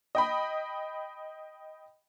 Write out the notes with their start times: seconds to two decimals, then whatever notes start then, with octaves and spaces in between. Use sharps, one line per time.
0.15 D#5 G5 B5